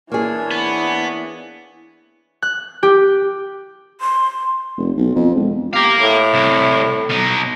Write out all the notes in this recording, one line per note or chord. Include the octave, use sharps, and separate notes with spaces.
E3 A#3 D4 G#4 C#5
B3
F#6
G4
C6
F1
B1
F2
E1
G4 A#4 F5
A2
C2
B2 D#4